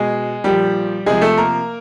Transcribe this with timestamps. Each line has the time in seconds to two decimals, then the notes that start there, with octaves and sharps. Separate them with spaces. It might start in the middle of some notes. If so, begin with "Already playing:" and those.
Already playing: B2 G#3 G#4
0.44 A#2 F3 G3 G4
1.06 C3 F3 G#3 G#4
1.22 A3 A4
1.37 A#3 A#4